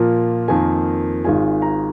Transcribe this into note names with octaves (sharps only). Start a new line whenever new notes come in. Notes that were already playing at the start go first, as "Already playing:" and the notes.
Already playing: A#2 F3 A#3 F4 F5
F2 D#3 A#3 G#5
G#1 G#2 D#3 G#3 F4 G#5
A#5